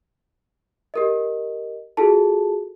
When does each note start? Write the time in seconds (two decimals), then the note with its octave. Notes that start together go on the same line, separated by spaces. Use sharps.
0.94 G4 A#4 D#5
1.97 F4 F#4 G#4 A4 A5